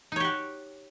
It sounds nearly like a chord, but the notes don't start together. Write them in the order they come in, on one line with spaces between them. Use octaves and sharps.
D#4 C#5 G4 F#4